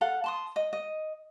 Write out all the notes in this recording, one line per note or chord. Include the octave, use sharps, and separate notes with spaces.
A4 F5 F#5
A5 C6 D#6
D#5
D#5